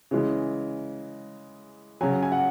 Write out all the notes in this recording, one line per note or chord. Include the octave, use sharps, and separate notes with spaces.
C#3 E3 G#3
C#3 F#3 G#5
G#5
F#5